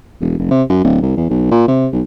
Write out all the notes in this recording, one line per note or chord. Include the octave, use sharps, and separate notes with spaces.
E1
F1
C3
F#2
D1
C2
E2
B1
A#2
C3
B1